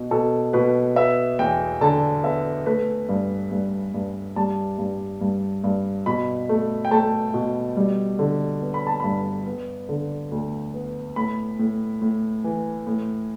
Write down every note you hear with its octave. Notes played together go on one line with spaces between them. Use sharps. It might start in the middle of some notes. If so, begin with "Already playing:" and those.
Already playing: B2
B2 A4
B2 B4
B3 E5
E2 G5
D3 A5
B3 E5
A3 B4
G2
G2
G2
G3 A5
G2
G2
G2
B2 B5
A3
G5
A3 A5
B2
G3
D3
B3
B5
A5
G2 B5
B3
D3
D2
B3
A2 B5
A2
A2
E3
A2